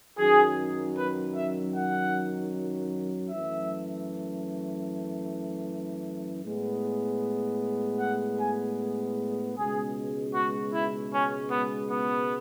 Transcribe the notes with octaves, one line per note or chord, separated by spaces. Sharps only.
F#2 D#3 F#3 G#4
B4
E5
F#5
F#2 E3 A3 E5
A2 G#3 B3
F#5
G#5
C#2 B2 G#3 G#4
F#4
E4
C#4
B3
B3